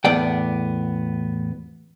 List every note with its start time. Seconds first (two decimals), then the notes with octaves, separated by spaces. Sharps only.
0.05 E2 A2 B3 D5 F#5 G5